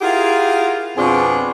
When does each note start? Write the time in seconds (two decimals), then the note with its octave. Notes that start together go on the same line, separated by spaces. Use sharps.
0.02 E4 F4 G4 G#4 A#4 F#5
0.97 F2 B2 C4 D4 F4 G#4